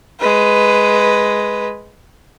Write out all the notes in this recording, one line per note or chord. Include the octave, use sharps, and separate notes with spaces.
G#3 B4